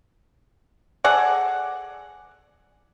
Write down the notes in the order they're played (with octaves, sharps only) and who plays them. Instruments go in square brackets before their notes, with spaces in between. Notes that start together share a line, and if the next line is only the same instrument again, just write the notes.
[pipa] G#4 A4 D5 F#5